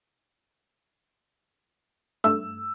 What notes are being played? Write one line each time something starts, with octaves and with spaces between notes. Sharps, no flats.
G2 A3 E6